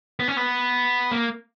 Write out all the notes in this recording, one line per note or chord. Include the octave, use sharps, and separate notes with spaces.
B3
C#4
B3
A#3